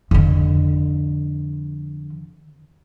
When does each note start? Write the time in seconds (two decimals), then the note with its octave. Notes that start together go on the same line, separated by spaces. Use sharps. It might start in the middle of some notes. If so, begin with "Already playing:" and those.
0.11 F2 D3